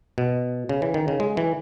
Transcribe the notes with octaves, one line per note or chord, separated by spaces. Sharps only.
B2
C#3
E3
D#3
C#3
G#3
E3